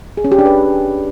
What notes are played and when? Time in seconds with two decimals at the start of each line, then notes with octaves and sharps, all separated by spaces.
0.17 G#4
0.24 C#4
0.32 G4
0.39 D4
0.46 B4